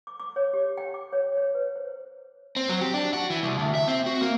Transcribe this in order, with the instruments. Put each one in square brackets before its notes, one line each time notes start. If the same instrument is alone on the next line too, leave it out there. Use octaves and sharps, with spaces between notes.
[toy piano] D6
D6
C#5
G4
G5
D6
C#5
C#5
B4
C5
[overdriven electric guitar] C4
F#3
G4
D4
F#4
E3
C2
D2
E5
C4
F#4
A#3